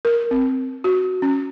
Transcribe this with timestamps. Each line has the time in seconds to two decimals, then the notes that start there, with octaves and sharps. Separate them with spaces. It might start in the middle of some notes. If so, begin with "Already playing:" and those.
0.05 A#4
0.31 C4
0.84 F#4
1.22 C#4